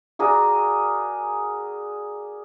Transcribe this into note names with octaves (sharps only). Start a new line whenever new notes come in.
F#4 G#4 A#4 D5